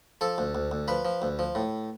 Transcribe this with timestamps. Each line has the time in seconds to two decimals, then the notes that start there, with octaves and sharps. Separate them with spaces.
0.21 F3 A4
0.38 D2
0.55 D2
0.72 D2
0.88 F3 B4
1.05 F3
1.22 D2
1.39 F3
1.55 A2